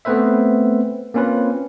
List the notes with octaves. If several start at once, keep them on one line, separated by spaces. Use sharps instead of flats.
A3 B3 C4 B4 C5 E5
A#3 C4 C#4 F4 B4